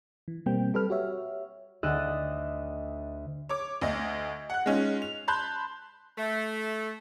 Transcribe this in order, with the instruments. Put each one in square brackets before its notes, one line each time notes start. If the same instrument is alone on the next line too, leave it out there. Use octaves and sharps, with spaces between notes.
[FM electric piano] E3
B2 G3 A#3 C4 G5
G3 A4 B4 F6
F#4 G4 C#5 E5
[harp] D2 A4 D#5 F#6 E7
[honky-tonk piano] C#5 D6
D2 D#5
F#5 F#6
G#3 C#4 D#4 F4
F7
A5 B5 C6 F#6 G6
[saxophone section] A3